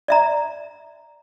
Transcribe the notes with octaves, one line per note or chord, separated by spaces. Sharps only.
D5 E5 A#5